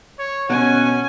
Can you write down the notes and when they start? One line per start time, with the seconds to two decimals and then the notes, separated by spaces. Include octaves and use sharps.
0.19 C#5
0.50 B2 C#4 F#5 G#5